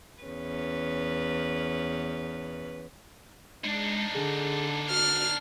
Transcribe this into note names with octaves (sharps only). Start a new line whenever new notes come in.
E2 C#4 B4
G#3 D4 D#4
D3 G#4
F#4 F6